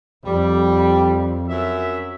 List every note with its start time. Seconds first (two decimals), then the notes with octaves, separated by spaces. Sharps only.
0.25 F2 G3
1.48 F#2 E5